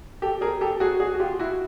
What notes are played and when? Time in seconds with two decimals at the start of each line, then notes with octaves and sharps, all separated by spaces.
0.22 G4 A4
0.41 G#4 A#4
0.61 G4 A4
0.80 F#4 G#4
1.00 F#4 G#4
1.14 F#4
1.20 F4 G4
1.39 E4 F#4